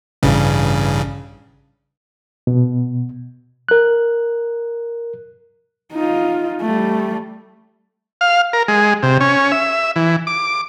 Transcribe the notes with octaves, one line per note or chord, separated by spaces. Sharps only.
A1 G2 C#3
B2
A#4 F#6
D#4 F4
G3 A3
F5
A#4
G#3
C3
C#4
E5
E3
D6